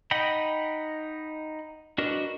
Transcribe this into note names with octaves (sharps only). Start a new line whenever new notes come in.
D#4 D#5 F#5 G5 B5
D4 F#4 A#4 B4 D#5